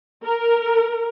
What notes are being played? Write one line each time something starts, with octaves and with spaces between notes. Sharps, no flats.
A#4